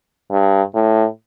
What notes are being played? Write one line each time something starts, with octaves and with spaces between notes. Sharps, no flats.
G2
A2